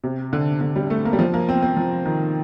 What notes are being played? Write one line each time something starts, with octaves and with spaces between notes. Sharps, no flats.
C3
D3
D3
G3
A3
A#3
G3
F3
A#3
C4
C4
F3
D#3